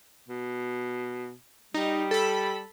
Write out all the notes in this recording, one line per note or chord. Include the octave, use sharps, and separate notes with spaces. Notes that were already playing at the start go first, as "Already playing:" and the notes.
B2
G3 D#4
A4 B5